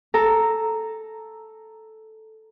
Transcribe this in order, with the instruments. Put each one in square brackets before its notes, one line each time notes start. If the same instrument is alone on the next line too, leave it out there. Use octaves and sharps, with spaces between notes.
[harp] A4 A#5